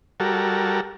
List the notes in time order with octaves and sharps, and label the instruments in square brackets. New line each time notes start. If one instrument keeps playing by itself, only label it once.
[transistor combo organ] G3 F#4 A4 A#4